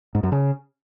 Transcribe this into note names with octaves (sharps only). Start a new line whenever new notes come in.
G#2
F#2
C#3